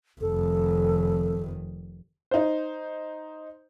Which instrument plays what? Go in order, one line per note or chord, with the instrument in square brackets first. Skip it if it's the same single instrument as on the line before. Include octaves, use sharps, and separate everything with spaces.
[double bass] F1 D#3 [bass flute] A4
[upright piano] D#4 C5